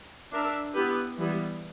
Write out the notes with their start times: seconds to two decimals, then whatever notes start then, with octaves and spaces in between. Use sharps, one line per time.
0.31 D4 A#4 E5
0.74 B3 E4 G4 B4
1.18 E3 G3 B3